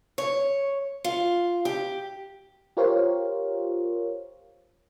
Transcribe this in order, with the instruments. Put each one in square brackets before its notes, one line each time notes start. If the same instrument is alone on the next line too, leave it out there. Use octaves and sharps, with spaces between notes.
[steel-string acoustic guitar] C#5
F4
G4
[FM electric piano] F4 G4 A#4 C5 C#5 F5